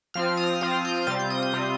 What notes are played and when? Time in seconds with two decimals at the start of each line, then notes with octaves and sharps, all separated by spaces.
0.14 F3 C4 F4 F6
0.37 D#6
0.61 F3 C4 F4 D#6
0.85 G6
1.07 C3 G3 C4 F4 A6
1.19 G6
1.30 D#6
1.43 D#6
1.53 C3 G3 C4 F4